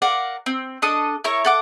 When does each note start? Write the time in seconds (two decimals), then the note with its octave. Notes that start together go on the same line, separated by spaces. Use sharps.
0.02 A#4 D5 F5 F#5
0.46 C4
0.82 D4 A4 D#5 D#6
1.24 E4 A#4 C#5 C#6
1.45 A4 F#5 D6